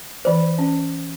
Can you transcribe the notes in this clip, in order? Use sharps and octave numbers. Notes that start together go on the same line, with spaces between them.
E3 C5 D5
C#4